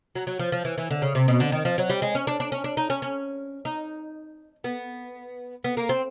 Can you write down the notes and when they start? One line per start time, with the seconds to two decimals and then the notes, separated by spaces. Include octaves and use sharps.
0.15 F#3
0.27 F#3
0.39 F3
0.52 F3
0.65 E3
0.78 E3
0.91 D3
1.02 C#3
1.15 C3
1.28 B2
1.40 D3
1.52 D#3
1.65 F3
1.78 F#3
1.90 G3
2.02 G#3
2.15 C#4
2.27 D4
2.40 D4
2.52 C#4
2.64 D4
2.77 D#4
2.90 C#4
3.02 C#4
3.65 D#4
4.64 B3
5.64 B3
5.77 A#3
5.89 C4